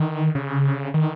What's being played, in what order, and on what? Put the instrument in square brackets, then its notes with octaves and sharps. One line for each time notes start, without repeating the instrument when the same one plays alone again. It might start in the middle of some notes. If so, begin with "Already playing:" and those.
Already playing: [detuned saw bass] D#3
C#3
D#3